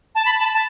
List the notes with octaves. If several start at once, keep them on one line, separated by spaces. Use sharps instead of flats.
A5
B5
A5
A5